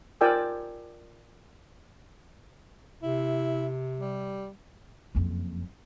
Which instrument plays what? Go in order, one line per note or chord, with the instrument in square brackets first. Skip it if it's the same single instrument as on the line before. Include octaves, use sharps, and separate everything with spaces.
[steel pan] F4 A#4 D5 G5 G#5 E6
[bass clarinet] C3 [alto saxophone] E4
[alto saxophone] G3
[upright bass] F#1 F2